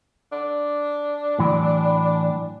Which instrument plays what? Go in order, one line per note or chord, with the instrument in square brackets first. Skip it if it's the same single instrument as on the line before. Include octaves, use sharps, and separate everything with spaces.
[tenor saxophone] D4
[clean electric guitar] A2 E3 F#3